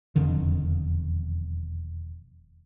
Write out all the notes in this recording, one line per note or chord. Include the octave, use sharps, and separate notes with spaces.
E1 F2 D3 D#3